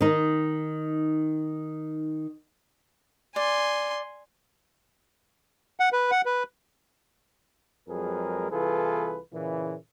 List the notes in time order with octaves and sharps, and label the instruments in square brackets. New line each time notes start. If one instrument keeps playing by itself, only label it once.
[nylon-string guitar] D#3 D#4
[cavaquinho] D5 [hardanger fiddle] G#5 C6
[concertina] F#5
B4
F#5
B4
[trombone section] F2 F#3 G#3 G#4 A#4 B4
C2 E3 F4 G#4 A4 B4
A#2 C#3 E3